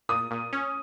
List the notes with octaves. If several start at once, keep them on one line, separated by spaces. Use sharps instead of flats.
A#2 D#6
A#2
C#4